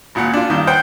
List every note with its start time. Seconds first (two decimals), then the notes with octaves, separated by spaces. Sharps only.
0.15 G#1 A#2 F#5
0.34 D4 F4
0.50 G2 D#3
0.67 C5 F#5 G5